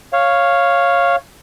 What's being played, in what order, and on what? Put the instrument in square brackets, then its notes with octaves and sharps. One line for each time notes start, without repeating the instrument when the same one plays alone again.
[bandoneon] C#5 F5